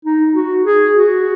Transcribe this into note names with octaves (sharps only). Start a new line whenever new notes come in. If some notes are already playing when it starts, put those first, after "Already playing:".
D#4
F#4
G#4
F#4